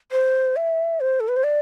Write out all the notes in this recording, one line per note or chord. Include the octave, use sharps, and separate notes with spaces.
C5
E5
C5
A4
B4
C5
D5